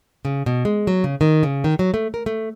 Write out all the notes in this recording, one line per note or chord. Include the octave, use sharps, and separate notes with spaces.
C#3
B2
G#3
F#3
C#3
D#3
C#3
D#3
F#3
A3
A#4
A3